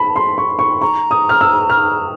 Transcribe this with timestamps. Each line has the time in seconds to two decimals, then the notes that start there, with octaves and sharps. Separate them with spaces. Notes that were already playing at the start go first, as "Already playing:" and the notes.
Already playing: A5 B5
0.16 C6
0.38 C#6
0.59 C#6
0.81 A#5 C#6
1.11 D#6
1.29 F6
1.41 E6
1.70 F6